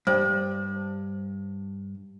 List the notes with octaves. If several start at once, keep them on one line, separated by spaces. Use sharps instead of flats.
G2 C5